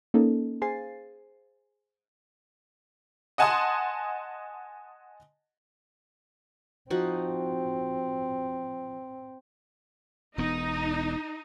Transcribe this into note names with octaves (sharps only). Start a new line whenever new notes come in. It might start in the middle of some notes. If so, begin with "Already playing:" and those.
A#3 C#4 D#4 A4
G#4 C5 F5 G#5 A6 C7
D#5 F#5 G#5 A5 C6 D#6
F3 C4 D#4 F#4
E1 E2 B3 D#4